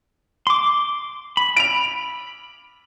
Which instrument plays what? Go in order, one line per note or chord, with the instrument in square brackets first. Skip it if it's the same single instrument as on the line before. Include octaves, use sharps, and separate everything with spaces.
[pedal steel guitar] C6 D6
B5
[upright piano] D7 F7